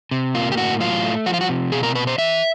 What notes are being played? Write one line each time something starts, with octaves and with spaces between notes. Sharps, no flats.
C3
A#3 F4
G4
A2 F#4
F#3 F4
A3
F3 F#4
F4
F#4
C3
B2 G#4
A#4
B2 B4
C5
E3 E5